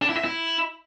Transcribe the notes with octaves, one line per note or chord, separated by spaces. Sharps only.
D4
E4
E5
E4